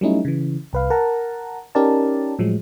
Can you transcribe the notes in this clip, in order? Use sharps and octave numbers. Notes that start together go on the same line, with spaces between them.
F#3 G3 A3 C#4 D#4 E4
C#3 E3
C2 B4 F5
A#4 F#5 A5 A#5
C#4 D#4 G4 A#4 D5 A5
A2 F3 F#3 G#3